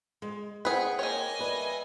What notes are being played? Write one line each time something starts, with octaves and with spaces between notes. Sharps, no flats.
G#3
C4 G#4 B4 F#5 G5
A#3 C#5 D#5 G#5
G3 B4 E5